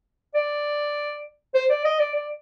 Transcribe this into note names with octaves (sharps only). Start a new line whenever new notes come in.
D5
C5
D5
D#5
D5
D5